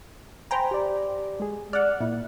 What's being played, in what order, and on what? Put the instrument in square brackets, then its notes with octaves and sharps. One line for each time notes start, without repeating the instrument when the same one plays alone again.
[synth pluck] C5 G5 A#5 [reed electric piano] G#5 B5
[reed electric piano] G4 D5
G#3 G#4
[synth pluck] D5 F#5 [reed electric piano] F6 F#6
[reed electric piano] A#2 A#3 [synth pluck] E4